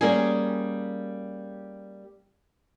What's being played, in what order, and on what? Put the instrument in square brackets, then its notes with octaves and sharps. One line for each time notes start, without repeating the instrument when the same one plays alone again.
[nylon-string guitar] G3 A#3 C#4 G#4